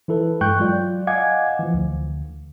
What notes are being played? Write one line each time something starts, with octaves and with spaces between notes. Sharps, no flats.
E3 E4 A4 B4
G2 G#3 G5 C#6 F#6 G6
F#3 F4 D5
D#5 F5 F#5 G#5 D6 G#6
E3 F3
D2 D3